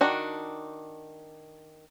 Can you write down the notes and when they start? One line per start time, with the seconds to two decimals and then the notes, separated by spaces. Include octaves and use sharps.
0.01 D#3 D4 F#4